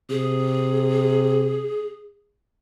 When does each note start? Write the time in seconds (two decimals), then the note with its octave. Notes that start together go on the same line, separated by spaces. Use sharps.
0.10 C3 G#4